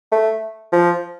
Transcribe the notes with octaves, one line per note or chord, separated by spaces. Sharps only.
A3
F3